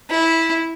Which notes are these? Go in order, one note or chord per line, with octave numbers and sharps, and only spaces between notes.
E4